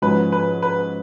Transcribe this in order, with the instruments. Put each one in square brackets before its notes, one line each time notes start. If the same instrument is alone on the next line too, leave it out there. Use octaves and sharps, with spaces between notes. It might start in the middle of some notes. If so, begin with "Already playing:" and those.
[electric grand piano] G#2 F3 G#3 C#4 F#4 [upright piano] B4
[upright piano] B4
B4